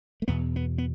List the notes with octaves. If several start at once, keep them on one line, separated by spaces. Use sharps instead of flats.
A3
E2 B2 B3
B3
B3